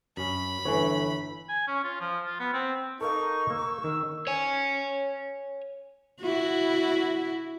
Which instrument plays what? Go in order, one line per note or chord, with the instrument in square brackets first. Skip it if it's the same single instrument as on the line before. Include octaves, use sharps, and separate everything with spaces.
[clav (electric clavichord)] F#2 C#4 [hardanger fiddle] B5
[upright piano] G1 A3 G#5 [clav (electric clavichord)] E3 B4 C#5
[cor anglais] G#5
C#4
F4
F3
F4
B3
C4
[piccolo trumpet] D#4 [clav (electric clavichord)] A4 A#4 F5 [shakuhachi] C#6
[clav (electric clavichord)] A#3 [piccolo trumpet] E6
[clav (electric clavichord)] D#3
[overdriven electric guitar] C#5 G#5
[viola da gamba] E4 F#4